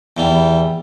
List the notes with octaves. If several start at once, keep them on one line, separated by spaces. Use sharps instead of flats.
E2 E3 G3